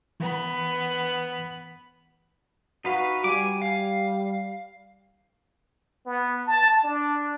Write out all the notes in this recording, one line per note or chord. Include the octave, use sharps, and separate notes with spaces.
E3 B3 B5
D#4 F#4 B4 F5
G3 G#5 D6
F5
B3
A5
D4